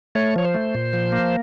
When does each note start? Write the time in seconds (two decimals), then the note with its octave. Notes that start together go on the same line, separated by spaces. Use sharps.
0.15 A3 C#5
0.36 F3 C#5
0.44 C5
0.54 A3
0.75 A#2
0.93 F3
1.12 A#3